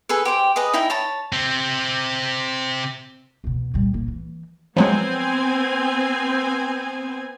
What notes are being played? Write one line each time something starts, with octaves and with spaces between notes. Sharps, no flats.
G#4 A4 B4
G4 C5 G5
G#4 B4 D#5
D#4 E4 G5
C#5 A5 B5
C3 C4
E2 B2
A#2 G3
A#3
E3
F3 F#3 G#3 B3 C4 G#5